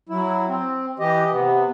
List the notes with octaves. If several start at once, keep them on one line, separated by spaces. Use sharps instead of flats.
F#3 E4
C4
E3 G4 D#5
C3 B3